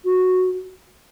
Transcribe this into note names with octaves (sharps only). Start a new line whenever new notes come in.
F#4